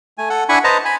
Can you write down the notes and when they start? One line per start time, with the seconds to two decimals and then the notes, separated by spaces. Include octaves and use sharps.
0.18 A3 G#5
0.30 A4 F#5
0.49 D4 E4 F#5 G#5 B5 C#6
0.64 B4 C5 D#5 A5 A#5
0.85 G#5 B5